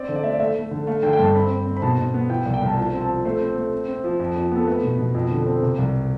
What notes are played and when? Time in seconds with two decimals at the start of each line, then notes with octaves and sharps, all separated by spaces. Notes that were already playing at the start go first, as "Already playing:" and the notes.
Already playing: C4 D5
0.09 D3
0.16 D5
0.24 A3 E5
0.31 D5
0.40 A3 E5
0.56 A3
0.71 D3
0.87 A3 F5
1.03 D3 G5
1.13 G5
1.19 G2 A5
1.35 C4 B5
1.51 C4
1.66 C4
1.77 B5
1.82 B2 A5
1.98 B2
2.14 B3
2.30 E3 G5
2.46 C2
2.54 G5
2.61 C2 A5
2.77 F3 A5
2.93 C4
3.01 A5
3.09 F3
3.25 A3 C5
3.41 C4
3.56 A3
3.72 C4
3.88 C4
4.04 F3
4.20 F2
4.36 F2
4.52 B3 A4
4.67 A3 B4
4.83 B2
4.99 B2
5.15 F2
5.31 D3
5.47 C4
5.63 C3
5.78 C2